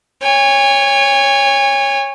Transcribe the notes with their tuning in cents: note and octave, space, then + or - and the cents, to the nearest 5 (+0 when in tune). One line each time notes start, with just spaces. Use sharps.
C#5 +0 G#5 -40